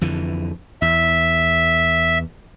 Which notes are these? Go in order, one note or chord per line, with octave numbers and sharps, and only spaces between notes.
F2 D3 E3
E2 E5